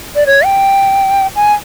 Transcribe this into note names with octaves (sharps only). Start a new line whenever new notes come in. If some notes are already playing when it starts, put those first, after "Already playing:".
D5
C#5
G5
G#5